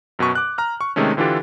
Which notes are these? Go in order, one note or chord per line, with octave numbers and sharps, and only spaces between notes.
F#2 B2 B4 C#6
D6 F#6
A#5 F6
C#6
C3 D#3 G#3 A3 C#4
D3 E3 D4 F4 G4 A4